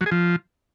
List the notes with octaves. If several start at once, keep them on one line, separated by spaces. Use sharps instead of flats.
F#3
G#4
F3